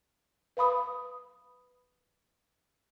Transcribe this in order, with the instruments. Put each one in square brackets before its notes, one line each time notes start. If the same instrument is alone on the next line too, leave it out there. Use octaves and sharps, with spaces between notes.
[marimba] B4 F5 B5 D#6